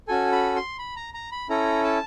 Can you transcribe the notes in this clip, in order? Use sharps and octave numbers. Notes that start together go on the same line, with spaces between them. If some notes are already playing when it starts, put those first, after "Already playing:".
C#4 F#4 A4 G#5
B5
C6
B5
A#5
A#5
B5
C#4 E4 A4 A#5
A5